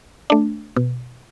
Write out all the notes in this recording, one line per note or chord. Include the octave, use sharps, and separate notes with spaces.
A3 D4
B2